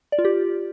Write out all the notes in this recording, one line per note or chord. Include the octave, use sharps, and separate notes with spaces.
D5
F4
G4